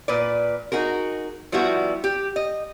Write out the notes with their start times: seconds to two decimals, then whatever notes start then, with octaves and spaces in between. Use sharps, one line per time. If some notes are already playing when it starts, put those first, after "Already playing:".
0.08 A#2 B4 D5
0.72 D#4 F#4 G#4 A#4
1.52 F3 G3 B3 E4 F#4
2.04 G4
2.36 D#5